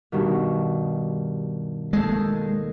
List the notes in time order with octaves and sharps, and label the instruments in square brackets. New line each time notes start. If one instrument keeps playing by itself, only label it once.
[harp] G2 B2 D#3
[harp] D#2 A4 G6 [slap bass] G#3